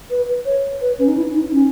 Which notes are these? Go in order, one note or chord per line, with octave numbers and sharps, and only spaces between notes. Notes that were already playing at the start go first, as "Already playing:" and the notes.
B4
C#5
B4
C#4
D#4
E4
D#4
C#4